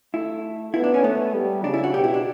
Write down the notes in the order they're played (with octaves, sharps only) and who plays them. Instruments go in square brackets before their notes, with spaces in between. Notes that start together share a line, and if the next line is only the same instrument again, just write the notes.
[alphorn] A3 [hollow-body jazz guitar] E4
[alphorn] B3 [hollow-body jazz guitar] E4
[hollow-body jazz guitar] D4
C#4
[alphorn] A3 [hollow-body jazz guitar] B3
[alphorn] G3
[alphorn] C#3 [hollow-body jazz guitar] D4
[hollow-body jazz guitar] E4
F#4
[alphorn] B2 [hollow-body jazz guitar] G4
[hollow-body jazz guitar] E4
D4